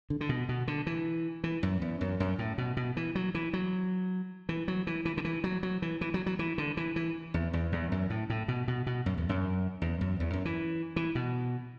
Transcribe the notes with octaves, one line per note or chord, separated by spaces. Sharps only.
D3
D3
B2
B2
D3
E3
E3
F#2
E2
F#2
F#2
A2
B2
B2
E3
F#3
E3
F#3
E3
F#3
E3
E3
D3
E3
F#3
F#3
E3
E3
F#3
F#3
E3
D3
E3
E3
E2
E2
E2
F#2
A2
A2
B2
B2
B2
F#2
E2
F#2
E2
F#2
E2
F#2
E3
E3
B2